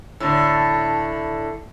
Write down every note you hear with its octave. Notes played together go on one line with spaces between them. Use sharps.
A2 D3